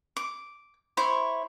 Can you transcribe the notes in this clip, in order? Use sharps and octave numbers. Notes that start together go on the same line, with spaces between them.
D6
E4 C5 C#5